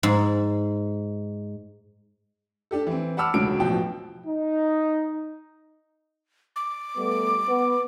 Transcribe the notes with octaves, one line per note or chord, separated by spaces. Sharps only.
G#2
D4 G4 A4
E3 C4
F#5 A5 B5 D6 E6 F6
E1 C#2 D3 F#3 F#4 D7
A1 B2 F3 G5
D#4
D6
G3 A3 B3
B3